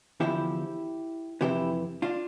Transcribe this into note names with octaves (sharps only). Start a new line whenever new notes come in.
E2 D3 F3 E4 G4
F2 C3 E3 E4 G4
D4 F4